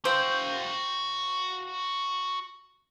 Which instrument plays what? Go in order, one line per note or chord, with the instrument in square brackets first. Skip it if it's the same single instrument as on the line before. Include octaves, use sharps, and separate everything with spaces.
[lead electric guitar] F#4 F5 [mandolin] C5 G5 E6